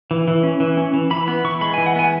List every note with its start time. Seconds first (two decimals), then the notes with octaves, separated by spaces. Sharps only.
0.11 E3
0.28 E3
0.43 C#4
0.60 E3
0.77 C#4
0.94 E3
1.10 E3 B5
1.27 B3 B5
1.44 E3 C#6
1.61 G#3 B5
1.74 E3 G#5
1.86 F#5
1.96 B3 G#5